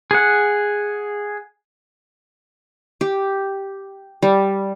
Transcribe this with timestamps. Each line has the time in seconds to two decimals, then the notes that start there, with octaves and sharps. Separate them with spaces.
0.11 G#4 F#5
3.01 G4
4.22 G3